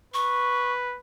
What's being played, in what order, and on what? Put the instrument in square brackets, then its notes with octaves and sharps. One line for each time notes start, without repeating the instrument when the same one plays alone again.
[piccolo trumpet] B4 [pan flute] C#6